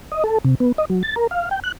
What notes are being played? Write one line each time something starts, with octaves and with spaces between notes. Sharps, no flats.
D#5
A4
C3
B3
D#5
F#3
A6
A#4
F5
G5
F#6